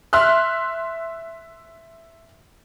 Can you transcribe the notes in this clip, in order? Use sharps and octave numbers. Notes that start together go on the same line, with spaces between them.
E5 C6 F6 F#6